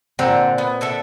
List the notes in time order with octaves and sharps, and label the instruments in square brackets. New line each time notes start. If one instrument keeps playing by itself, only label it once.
[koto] A#2 C4 [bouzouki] D3 A#5
[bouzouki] B3
D3 A4 E5